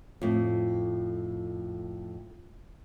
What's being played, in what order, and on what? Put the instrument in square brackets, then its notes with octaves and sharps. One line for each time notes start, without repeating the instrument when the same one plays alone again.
[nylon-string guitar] F2 A2